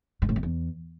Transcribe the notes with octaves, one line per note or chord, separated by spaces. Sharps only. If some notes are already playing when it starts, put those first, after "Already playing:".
G#2
A2
F2
E2